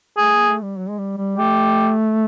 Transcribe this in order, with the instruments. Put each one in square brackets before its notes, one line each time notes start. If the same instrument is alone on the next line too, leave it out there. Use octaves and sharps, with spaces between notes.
[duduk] A3 [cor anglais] G#4
[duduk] A#3
A3
G3
F#3
G#3
G3
G3
[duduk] A3 [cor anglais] G4